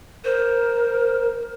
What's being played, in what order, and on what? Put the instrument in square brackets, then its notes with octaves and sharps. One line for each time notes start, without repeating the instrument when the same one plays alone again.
[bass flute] A#4 [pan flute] C5